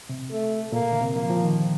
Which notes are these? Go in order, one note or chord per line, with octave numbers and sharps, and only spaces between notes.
C3
A3
A#2 A#3
D3
C3
F3 A#3
F3
D#3